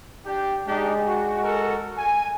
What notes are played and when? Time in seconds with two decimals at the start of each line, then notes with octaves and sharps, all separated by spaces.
0.25 D4 G4
0.68 G#3 D4 D#4 G4
1.07 F#4
1.43 F#4 A4 A#4
1.97 G#5